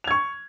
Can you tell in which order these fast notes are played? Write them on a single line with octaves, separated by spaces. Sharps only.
F7 G#6 C#6